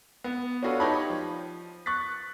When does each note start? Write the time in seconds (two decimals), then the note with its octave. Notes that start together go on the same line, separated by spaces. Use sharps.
0.24 B3
0.63 C#4 D4 F4 F#4 A4 B4
0.80 D#4 G4 C#5 A5 B5
1.10 F3
1.86 C#6 F#6 A6 B6